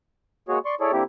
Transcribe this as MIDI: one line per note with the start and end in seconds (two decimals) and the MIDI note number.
0.48 0.59 56
0.48 0.59 58
0.48 0.59 66
0.48 0.59 68
0.48 0.59 73
0.65 0.75 74
0.65 0.75 84
0.65 0.75 85
0.80 0.92 64
0.80 0.92 68
0.80 0.92 69
0.80 0.92 73
0.80 0.92 74
0.92 1.03 50
0.92 1.03 58
0.92 1.03 60
0.92 1.03 64
0.92 1.03 67